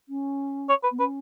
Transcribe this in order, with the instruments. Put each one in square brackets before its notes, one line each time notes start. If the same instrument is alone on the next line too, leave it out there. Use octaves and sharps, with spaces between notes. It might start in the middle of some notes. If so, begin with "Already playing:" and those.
[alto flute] C#4
[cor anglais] C#5
B4
[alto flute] B3
[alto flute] C#4 [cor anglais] B4